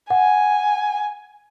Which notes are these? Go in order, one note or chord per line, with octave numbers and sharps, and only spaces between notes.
F#5 G#5